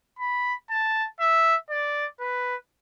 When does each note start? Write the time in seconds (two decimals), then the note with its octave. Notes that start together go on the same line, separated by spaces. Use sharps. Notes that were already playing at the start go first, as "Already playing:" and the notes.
0.19 B5
0.70 A5
1.20 E5
1.70 D5
2.20 B4